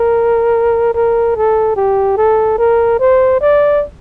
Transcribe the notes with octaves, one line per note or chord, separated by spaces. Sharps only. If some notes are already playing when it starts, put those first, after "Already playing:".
Already playing: A#4
A#4
A4
G4
A4
A#4
C5
D5